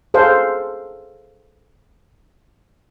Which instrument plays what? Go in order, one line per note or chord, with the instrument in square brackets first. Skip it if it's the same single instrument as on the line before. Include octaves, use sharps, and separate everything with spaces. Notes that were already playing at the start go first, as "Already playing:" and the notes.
[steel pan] G#4 A4 C5 F5